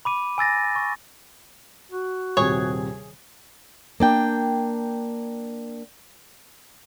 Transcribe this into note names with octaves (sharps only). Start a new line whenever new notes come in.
B5 D6 D#7
G#5 E6 A6 A#6
C#6
F#4
D#1 C3 G#4 C#5
A#3 D4 G5